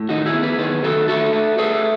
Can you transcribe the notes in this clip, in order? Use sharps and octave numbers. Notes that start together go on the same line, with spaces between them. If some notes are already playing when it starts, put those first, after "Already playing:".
Already playing: A2
D#3 D#4 F#4
E4 G#4
B3
G#4 B4
D#3 G#4 B4
D#3 F#4 A4
A3 F#4 A4
A3
A3 G#4 B4